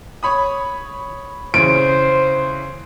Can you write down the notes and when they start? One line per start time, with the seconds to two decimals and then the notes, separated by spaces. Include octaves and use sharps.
0.23 C#5 B5 D#6
1.54 C#3 E3 C5 D7